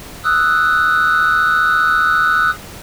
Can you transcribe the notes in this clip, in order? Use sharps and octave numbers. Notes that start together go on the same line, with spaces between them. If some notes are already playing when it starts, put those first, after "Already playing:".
D#6 E6 F#6